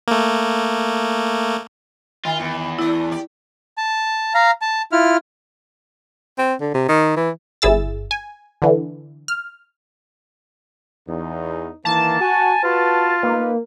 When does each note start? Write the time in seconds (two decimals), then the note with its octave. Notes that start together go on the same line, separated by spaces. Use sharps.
0.08 A3 A#3
2.25 D#3 F4
2.40 E2
2.79 A3 B3 E4 D5
3.12 G4 D5
3.78 A5
4.34 F5 A#5
4.61 A5
4.92 E4 F4 F6
6.38 C4
6.61 D3
6.74 C3
6.88 D#3
7.16 E3
7.62 G1 E4 G#4 E6 A6
8.11 G#5
8.62 D3 E3
9.28 F6
11.08 E2 D#4
11.85 D#3 E3 A#3 A5
12.21 F#4 G#5
12.64 F4 F#4 B4
13.23 A#3 D#4 B4